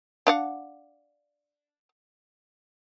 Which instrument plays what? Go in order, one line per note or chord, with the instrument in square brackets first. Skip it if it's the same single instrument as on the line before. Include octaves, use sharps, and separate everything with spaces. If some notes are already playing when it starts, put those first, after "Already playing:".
[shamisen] D4 F5 F#5